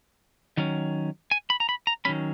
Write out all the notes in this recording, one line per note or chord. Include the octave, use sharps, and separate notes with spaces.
D#3 F#3 C#4
G#5
B5
A#5
B5
A#5
D#3 F#3 C#4 B5